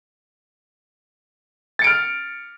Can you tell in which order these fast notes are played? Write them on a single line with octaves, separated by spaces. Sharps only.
A6 C#7 D7 F6